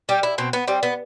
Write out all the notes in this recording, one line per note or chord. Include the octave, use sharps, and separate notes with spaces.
G3 G4
E4
B2 C4
B3
G3 C4
B3